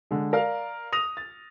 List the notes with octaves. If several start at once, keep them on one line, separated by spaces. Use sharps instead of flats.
D3 G#3
A#4 D5 F5 F6
D#6 A#6 F7
A6